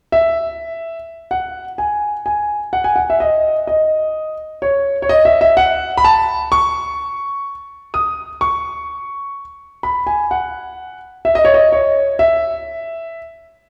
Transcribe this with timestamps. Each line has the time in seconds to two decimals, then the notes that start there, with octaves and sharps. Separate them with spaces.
0.12 E5
1.31 F#5
1.78 G#5
2.26 G#5
2.73 F#5
2.84 G#5
2.96 F#5
3.10 E5
3.20 D#5
3.67 D#5
4.62 C#5
5.02 C#5
5.09 D#5
5.25 E5
5.41 E5
5.57 F#5
5.97 B5
6.05 A5
6.52 C#6
7.94 D#6
8.41 C#6
9.83 B5
10.07 G#5
10.31 F#5
11.25 E5
11.35 D#5
11.45 C#5
11.54 D#5
11.72 C#5
12.19 E5